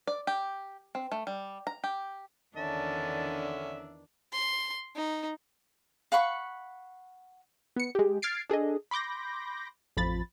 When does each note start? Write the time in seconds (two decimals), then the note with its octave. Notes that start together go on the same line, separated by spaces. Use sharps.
0.07 D5
0.27 G4
0.95 C4
1.12 A3
1.27 G3
1.67 A#5
1.84 G4
2.56 E2 D3 D#3 C#4 D4 E5 A5
4.33 C6
4.96 D#4
6.12 F5 F#5 B5 C#6
7.76 B3 C#7
7.95 G#3 G4
8.22 F6 G#6 A6 C7 D7
8.50 D4 G#4 A4 D#5
8.91 B5 C6 D6 G6 A#6
9.97 A1 F2 F3 B5 A6